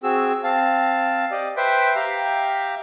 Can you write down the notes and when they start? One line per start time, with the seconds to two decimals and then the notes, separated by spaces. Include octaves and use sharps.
0.03 C4 F#4 G#4 E6
0.44 C4 F5 A5
1.31 G4 D5 D#5
1.57 B4 C5 E5 G5
1.96 G4 E5 F5 G5 A#5